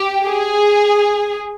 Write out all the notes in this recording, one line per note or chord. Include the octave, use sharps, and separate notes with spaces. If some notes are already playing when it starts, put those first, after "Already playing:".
Already playing: G4
G#4